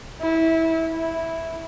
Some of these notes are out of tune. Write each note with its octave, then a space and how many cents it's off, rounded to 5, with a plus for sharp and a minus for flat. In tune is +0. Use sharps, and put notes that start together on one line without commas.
E4 -20
E4 -5